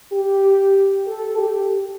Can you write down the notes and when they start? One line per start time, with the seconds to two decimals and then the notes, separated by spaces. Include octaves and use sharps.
0.13 G4
1.07 A4
1.38 G4